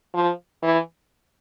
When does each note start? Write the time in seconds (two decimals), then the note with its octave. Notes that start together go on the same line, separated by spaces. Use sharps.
0.15 F3
0.63 E3